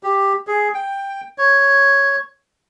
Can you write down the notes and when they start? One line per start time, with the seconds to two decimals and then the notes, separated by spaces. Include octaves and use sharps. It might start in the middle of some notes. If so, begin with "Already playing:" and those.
0.03 G4
0.47 G#4
0.74 G5
1.38 C#5